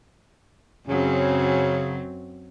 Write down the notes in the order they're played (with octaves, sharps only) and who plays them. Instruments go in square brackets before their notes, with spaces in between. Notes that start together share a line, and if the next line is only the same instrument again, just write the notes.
[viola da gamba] F#2 F#3 C4 [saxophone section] C#3